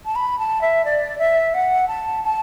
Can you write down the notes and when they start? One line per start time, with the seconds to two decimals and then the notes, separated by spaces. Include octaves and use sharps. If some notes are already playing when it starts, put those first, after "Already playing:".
0.05 A5
0.15 B5
0.39 A5
0.61 E5
0.85 D5
1.18 E5
1.54 F#5
1.88 A5
2.23 A5